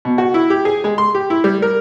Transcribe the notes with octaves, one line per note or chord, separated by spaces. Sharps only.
B2
F#4
E4
G4
G#4
G#3
C6
G4
E4
G3
A#4